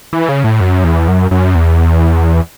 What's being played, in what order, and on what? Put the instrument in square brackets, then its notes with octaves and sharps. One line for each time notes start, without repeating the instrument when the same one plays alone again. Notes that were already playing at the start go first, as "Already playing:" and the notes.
[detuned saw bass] E3
C#3
A2
F#2
E2
F#2
F#2
E2